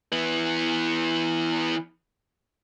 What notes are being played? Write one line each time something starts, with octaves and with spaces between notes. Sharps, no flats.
E3 B3